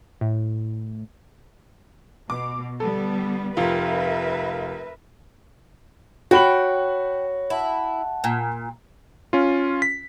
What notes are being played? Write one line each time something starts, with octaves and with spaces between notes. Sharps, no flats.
A2
B2 D6
D3 G3 B3 A4
F1 F4 A#4 B4 E5
F#4 C#5 G5 B5 F#7
E4 F#5 A5
A#2
C#4 F4
B6